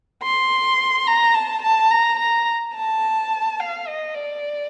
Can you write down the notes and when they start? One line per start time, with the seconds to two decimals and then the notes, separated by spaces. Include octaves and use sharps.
0.23 C6
1.07 A#5
1.34 A5
1.62 A5
1.90 A#5
2.19 A#5
2.75 A5
3.60 F5
3.87 D#5
4.15 D5